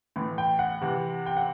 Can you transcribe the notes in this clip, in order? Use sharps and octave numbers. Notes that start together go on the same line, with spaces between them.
A2 E3
G5
F#5
C3 E3
G5
F#5